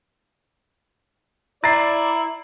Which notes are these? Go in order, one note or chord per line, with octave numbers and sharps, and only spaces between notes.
E4 D5 A#5 A6 C7